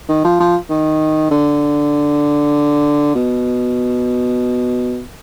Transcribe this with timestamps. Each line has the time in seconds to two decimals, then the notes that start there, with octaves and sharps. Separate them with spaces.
0.09 D#3
0.24 F3
0.40 F3
0.69 D#3
1.31 D3
3.15 B2